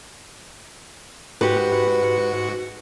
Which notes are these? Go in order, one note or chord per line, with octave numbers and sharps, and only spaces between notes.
G#2 F#4 G4 B4 C#7